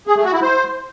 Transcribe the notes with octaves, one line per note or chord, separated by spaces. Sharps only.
G#4
A3
F#4
E4
C5